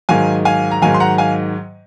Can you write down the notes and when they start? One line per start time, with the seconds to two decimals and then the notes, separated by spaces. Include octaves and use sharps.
0.09 G#2 D#3 F#3 F5 G#5
0.45 F5 G#5
0.71 A#5
0.82 G#2 D#3 F#3 F5 G#5
0.94 C6
1.00 F#5 A#5
1.18 F5 G#5